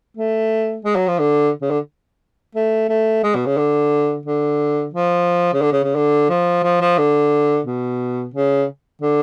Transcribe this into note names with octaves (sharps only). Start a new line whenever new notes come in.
A3
G#3
F#3
F3
D3
C#3
D3
A3
A3
G#3
B2
C#3
D3
D3
F3
C#3
D3
C#3
C#3
D3
F3
F3
F3
D3
B2
C#3
D3